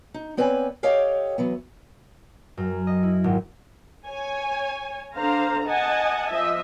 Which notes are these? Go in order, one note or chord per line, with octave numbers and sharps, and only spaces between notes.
D#4
B3 C4 B4 C#5 D5 G#5
G4 A4 C#5 D#5 F5 G5
E3 F#3 B3
F#2
D#5
E4
G#1
C#5 G#5
D3 D4 C5 F5 A#5
D#5 F#5 G#5 A5
F3 D#5 E5